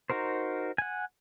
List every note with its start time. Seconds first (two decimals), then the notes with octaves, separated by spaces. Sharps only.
0.10 D#4 F#4 A#4 C5
0.78 F#5 G#5